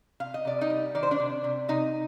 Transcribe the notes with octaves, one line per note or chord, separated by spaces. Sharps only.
C3 F5
D#5
C3 D5
D#4 D#5
G3
D#3 D5
C5
D4 D5
C3
C3
C3 D#4 D#5